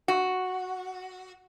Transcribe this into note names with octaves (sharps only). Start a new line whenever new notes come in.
F#4